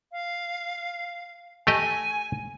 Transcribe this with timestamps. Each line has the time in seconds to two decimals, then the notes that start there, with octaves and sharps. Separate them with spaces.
0.12 F5
1.67 A3 G4 D#5 G#5